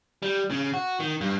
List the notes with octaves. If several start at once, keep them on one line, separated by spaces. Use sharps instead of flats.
G3
C#3
F#4
D#3
G2